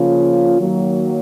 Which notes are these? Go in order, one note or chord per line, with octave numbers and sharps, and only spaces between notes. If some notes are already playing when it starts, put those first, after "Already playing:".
Already playing: C#3 F3 A#3 C#4 F4
D#3 F#3 A#3